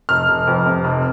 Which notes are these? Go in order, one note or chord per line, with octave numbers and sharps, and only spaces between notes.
F1 F6
F1
F2
C3
F1